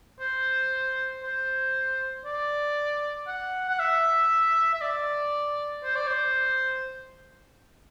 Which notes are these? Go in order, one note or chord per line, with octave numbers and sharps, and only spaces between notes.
C5
C5
D5
F#5
F#5
E5
E5
D5
C5
D5
C5